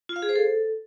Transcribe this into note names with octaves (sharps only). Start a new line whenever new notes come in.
F4
F5
G#4
C5
A4